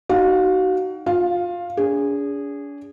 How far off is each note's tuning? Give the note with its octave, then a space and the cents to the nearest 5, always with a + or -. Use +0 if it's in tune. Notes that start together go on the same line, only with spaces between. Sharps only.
D#4 +0 F#4 +25 F5 +30
F4 +25 F5 +0
D4 -45 G#4 -15